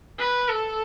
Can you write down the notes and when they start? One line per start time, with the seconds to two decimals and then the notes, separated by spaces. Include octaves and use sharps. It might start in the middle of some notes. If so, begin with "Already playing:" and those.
0.19 B4
0.49 A4